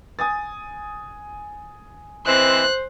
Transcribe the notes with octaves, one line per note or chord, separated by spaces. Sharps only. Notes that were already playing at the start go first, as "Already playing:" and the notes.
G#5 D#6 A6
E3 G#3 C4 C5 F#6